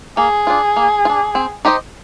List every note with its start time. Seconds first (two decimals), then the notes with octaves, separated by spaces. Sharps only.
0.17 A#3 G#4
0.47 D4 F4
0.76 A#3
1.05 F4
1.10 D4
1.35 C4
1.65 D#4 G4 C5 D#5